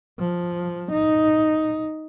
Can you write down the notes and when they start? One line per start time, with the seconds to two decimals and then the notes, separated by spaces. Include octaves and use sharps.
0.20 F3
0.92 D#4